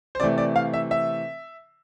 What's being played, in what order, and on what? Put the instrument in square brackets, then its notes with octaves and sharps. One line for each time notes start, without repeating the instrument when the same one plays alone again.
[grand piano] C5
C3 E3 A3 D5
D5
F5
E5
E5